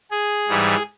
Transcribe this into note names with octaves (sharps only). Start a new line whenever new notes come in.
G#4
G#2 E3 G3